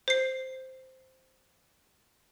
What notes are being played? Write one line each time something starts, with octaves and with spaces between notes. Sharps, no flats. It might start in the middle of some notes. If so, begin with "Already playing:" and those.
C5 C7